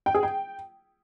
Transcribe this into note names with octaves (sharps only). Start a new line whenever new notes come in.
G5
G#4
G5